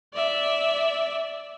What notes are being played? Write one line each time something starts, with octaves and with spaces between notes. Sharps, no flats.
D5 E5